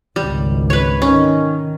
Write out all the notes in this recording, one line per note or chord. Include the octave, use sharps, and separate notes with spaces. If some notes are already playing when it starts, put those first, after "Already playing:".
G#1 C#2 G3
B4 C#5
D#3 C#4